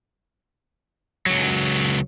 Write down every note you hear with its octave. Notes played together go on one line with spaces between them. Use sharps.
C#2 F#3